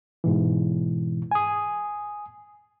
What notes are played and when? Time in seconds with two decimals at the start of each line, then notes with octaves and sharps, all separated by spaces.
0.24 G#2 B2 E3
1.31 G#5 D#6